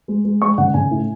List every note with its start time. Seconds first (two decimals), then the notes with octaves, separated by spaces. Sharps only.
0.08 G#3
0.25 G#3
0.41 G#3 C#6
0.58 C#3 F#5
0.74 C#3 G#5
0.91 A2